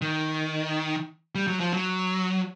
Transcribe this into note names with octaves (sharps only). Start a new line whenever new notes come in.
D#3
G3
F#3
F3
F#3